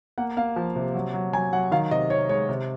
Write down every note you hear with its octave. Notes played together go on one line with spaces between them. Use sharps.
A#3 F#5
A#3 F5
F3
C3
F#3
F#3
F#3 G#5
F#3 F#5
D#3 F5
C3 D#5
C3 C#5
G#3 C#5
C3